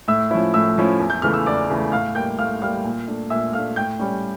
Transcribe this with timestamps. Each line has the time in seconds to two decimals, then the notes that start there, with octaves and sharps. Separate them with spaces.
0.08 A2 E5 E6
0.31 F3 C#4 E4
0.54 A2 E5 E6
0.78 F3 C#4 E4
1.00 E2
1.10 G6
1.22 C#3 E3 A3 F6
1.34 E6
1.46 E2 D5 D6
1.70 C#3 E3 A3
1.92 A2 F5 F6
2.15 G3 A#3 G5 G6
2.39 A2 F5 F6
2.62 G3 A#3 F5 F6
2.84 A#2
3.07 A3 D4
3.30 A#2 E5 E6
3.53 A3 D4 F5 F6
3.76 A2 G5 G6
3.99 G3 C#4